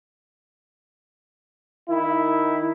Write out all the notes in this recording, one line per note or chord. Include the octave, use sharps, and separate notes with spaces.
D#3 E4